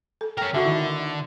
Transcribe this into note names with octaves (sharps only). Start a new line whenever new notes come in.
A4
C#4 A#4 G5
D3 F#4 A4 E5 C#6
D#3 E4